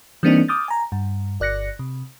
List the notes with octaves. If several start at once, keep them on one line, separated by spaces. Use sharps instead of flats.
E3 G3 A#3 C4 D4 D#4
D6 D#6 F6 G6 A6
G#5 A#5
G2
G1 D5 F#6 A#6 C#7
C3